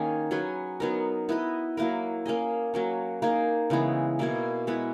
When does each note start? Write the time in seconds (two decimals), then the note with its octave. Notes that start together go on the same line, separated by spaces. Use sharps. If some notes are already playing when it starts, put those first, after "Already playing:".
Already playing: D#3 A#3 C#4 G#4
0.31 F#3 C#4 G#4 B4
0.80 F#3 B3 D#4 A#4
1.29 B3 E4 B4 D#5
1.77 F#3 A#3 E4 A#4
2.26 A#3 C#4 G#4 D#5
2.74 F#3 A#3 C#4
3.22 A#3 D#4 G#4
3.70 C#3 E3 G#3 B3
4.19 B2 A#3 E4 G#4
4.67 G#3 B3 E4 B4